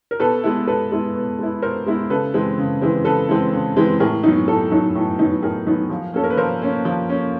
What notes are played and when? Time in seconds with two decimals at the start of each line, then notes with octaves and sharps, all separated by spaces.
0.11 A#4
0.19 B2 A4 B4
0.44 G#3 B3 E4
0.67 B2 A4 B4
0.92 G#3 B3 E4
1.15 B2
1.38 G#3 B3 E4
1.62 B2 A#4 C5
1.86 G#3 B3 E4
2.10 C#3 A4 B4
2.34 E3 G#3 C4
2.58 C#3
2.81 E3 G#3 C4
3.05 C#3 A4 B4
3.29 E3 G#3 C4
3.53 C#3
3.76 E3 G#3 C4
4.00 A2 G#4 A#4
4.23 F#3 B3 D#4
4.47 A2 A4
4.71 F#3 B3 D#4
4.95 A2
5.19 F#3 B3 D#4
5.43 A2 G#4 A#4
5.67 F#3 B3 D#4
5.90 F3
6.14 A#3 C#4 A4
6.24 A#4
6.30 B4
6.37 F3 A#4 C5
6.62 A#3 C#4
6.85 F3
7.09 A#3 C#4